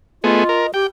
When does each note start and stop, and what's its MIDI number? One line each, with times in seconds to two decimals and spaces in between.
0.24 0.44 57
0.24 0.44 59
0.24 0.67 65
0.24 0.44 68
0.24 0.71 75
0.49 0.67 70
0.74 0.86 67
0.74 0.87 79